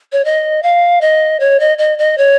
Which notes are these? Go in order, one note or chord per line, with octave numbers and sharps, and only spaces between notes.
C#5
D#5
F5
D#5
C#5
D#5
D#5
D#5
C#5